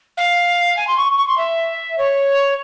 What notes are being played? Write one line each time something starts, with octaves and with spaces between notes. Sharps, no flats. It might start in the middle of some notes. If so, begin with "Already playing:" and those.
F5
G#5
C6
C#6
C#6
C6
E5
C#5